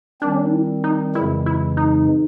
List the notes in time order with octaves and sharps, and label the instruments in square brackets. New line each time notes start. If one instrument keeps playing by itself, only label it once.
[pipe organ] D#3 G3 C4 [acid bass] D4
[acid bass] C#4
D4
D#4
E4
D#4
[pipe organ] F2 C#3 E3 G#3 [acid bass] E4
[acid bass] E4
D#4